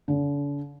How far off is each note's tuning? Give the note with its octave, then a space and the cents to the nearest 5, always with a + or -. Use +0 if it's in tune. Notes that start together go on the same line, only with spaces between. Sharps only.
D3 -45